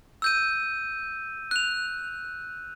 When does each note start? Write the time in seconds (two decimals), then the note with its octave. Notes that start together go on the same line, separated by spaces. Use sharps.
0.22 E6 G6 D#7
1.51 F#6 F7